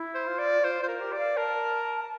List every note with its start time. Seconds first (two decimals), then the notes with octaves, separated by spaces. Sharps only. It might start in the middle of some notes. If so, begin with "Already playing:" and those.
Already playing: E4
0.15 C5
0.27 F4
0.39 D5
0.63 F4 C5
0.82 F4 C5
0.88 A#4
1.00 G4
1.12 D5
1.19 F5
1.37 A#4 A5